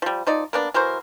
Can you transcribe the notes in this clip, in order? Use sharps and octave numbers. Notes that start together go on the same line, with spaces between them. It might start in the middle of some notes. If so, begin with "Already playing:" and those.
F3 G3
F3 D#4 D5
A#3 B3 D4
E3 F#3 A#4 C5